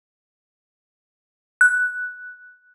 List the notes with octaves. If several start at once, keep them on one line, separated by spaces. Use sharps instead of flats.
F#6